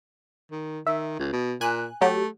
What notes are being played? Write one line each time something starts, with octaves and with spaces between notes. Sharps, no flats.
D#3
D#3 E5
C#2
B2
A#2 G#5 F#6
F#3 A3 G4